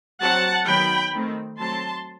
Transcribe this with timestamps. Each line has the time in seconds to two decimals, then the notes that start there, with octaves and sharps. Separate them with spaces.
0.21 F#3 C4 F#5 A5
0.67 D#3 F#3 B3 G5 B5
1.13 D#3 A3 C4
1.58 F#3 A3 C4 A5 C6